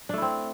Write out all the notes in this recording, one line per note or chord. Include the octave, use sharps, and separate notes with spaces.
A3 C4 D4 E4